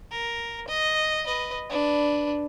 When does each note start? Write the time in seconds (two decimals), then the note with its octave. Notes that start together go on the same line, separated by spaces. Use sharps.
0.11 A#4
0.68 D#5
1.26 B4 D#5
1.70 D4 B4